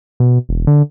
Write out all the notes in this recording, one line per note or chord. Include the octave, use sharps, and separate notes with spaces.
B2
E1
D3